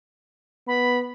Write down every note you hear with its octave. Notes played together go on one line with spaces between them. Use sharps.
B3 B5